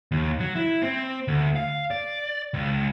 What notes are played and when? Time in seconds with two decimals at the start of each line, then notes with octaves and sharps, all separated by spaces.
0.12 D#2
0.40 F#3
0.55 E4
0.83 C4
1.28 D2
1.56 F5
1.91 D5
2.54 C#2